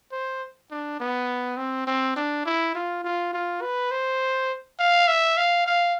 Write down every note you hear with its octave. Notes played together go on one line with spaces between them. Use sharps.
C5
D4
B3
C4
C4
D4
E4
F4
F4
F4
B4
C5
F5
E5
F5
F5